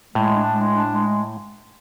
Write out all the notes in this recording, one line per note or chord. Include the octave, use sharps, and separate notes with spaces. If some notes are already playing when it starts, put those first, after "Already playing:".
A2 G#3
D4
G#3
D4
G#3